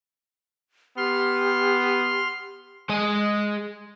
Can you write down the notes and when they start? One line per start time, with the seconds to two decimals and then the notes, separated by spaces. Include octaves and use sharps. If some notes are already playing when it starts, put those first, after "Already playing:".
0.97 B3 G4 C6 F6
2.89 G#3 D#5